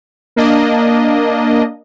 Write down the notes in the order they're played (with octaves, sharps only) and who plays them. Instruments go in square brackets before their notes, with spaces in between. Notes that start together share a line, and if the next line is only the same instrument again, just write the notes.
[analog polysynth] A#3 D4 D#5